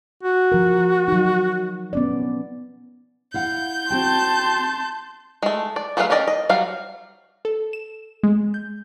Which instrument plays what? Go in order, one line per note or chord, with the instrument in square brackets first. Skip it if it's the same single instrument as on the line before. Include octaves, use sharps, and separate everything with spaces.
[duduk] F#4
[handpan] F3 A#4
F#3 D#4
B3 C#4 D5
[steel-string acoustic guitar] E4 F5 F#5 [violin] G6
[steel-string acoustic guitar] C4 F#4 G5 [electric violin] A5 C6
[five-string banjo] G#3 A3
D5
F#3 A3 G#4 B4 F5
C#4 G4 A#4 D5 D#5
D#5
F#3 G3 F5
[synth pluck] A4
E7
G#3
G6